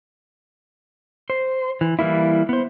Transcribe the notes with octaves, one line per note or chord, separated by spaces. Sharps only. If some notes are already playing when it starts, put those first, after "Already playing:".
C5
E3
E3 G3 A#3 E4
B3 C5